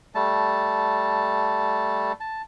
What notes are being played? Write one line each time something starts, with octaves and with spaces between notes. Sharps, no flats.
G3 A3 A5
A5